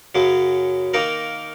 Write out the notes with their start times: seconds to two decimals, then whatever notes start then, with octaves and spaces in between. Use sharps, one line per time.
0.15 F#2 C#3 F#3
0.94 D#3 A#3 D#4 A#4